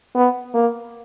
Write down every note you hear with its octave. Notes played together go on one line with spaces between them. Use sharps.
B3
A#3